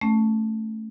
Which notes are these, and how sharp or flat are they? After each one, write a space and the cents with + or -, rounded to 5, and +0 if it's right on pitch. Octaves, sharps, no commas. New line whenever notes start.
A3 +0 C#4 +0